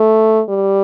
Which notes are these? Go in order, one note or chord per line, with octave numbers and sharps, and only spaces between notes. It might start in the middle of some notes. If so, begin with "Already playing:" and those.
Already playing: A3
G3